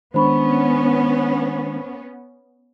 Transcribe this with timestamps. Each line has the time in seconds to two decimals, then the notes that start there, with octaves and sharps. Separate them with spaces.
0.14 D#3 G#3 B3 C#4 D4 C5 B5 C#6